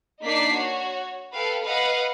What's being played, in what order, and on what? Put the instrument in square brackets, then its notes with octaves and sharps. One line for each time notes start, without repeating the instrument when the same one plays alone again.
[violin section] A#3 D4 D#4 D5 B6 C7
F#4 C#5
A4 B4 F5 G5
B4 D#5 F5 F#5